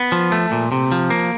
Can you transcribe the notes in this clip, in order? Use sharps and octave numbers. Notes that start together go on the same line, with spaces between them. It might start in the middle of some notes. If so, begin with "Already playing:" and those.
Already playing: B3
F3
A3
A#2
C3
F3
A#3